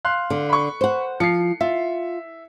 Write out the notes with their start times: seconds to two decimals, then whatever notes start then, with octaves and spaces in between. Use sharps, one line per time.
0.05 F5 C6 F#6
0.30 D3
0.49 B5 C#6
0.81 C5 F#5
1.20 F3 C7 C#7
1.61 F4 E5